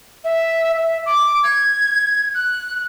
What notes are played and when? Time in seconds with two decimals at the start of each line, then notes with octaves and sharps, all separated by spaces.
0.24 E5
0.78 E5
1.06 D6
1.44 G#6
2.35 F#6